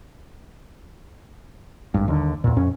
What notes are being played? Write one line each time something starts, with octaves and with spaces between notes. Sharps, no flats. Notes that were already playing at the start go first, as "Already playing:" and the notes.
G#1 G2
D#2 D3
E2 A#2
F2 C#4